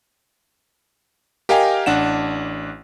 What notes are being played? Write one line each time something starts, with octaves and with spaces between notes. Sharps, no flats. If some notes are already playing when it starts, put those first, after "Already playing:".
G4 A#4 D#5 F5 G5 G#5
A1 D4 F#5 E7